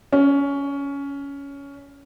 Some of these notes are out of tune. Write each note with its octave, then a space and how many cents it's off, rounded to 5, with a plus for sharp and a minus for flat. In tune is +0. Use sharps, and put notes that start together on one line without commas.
C#4 +15